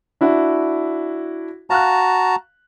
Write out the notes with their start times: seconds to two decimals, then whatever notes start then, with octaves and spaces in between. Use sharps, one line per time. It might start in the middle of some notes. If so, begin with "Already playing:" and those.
0.21 D4 E4 F#4
1.70 F#4 F5 A5 A#5 F6 F#6